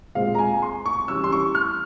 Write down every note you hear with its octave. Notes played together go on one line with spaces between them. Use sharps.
A#2 G#3 C4 F5
A#5
G#5
C6
C#6
E3 G3 C#4 E6
C6
C#6
F6